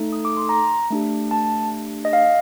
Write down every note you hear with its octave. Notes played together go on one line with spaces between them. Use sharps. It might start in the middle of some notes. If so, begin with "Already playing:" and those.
Already playing: A3 D#4 A4
D#6
D6
C6
A#5
A3 D4 G4
A5
D#5
F5